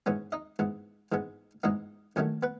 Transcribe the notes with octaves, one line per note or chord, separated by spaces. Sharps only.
G#2 E3 B3 C#4 C#5
D#4 D#5
G#2 E3 B3
G#2 E3 G#3 B3
G#2 E3 G#3 B3 D#4 D#5
E2 D#3 F#3 A3 C#4 C#5
B3 B4